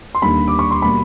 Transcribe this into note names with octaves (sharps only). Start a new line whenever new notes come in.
C6
D#2 D3 G3 A#3 B5
D6
C#6
C6
B2 G3 A#3 B5